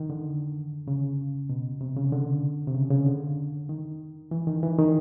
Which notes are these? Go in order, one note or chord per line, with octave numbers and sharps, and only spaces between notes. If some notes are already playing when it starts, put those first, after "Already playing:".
Already playing: D#3
D3
C#3
B2
C3
C#3
D3
C3
C#3
C#3
D3
D#3
E3
D#3
E3
D#3